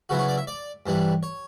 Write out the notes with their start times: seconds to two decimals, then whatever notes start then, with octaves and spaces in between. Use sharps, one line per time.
0.09 C#3 F#3 B3 E4 F#4
0.19 C#5
0.28 D5
0.38 E5
0.47 D5
0.86 G2 E3 G3 D4
1.23 C#5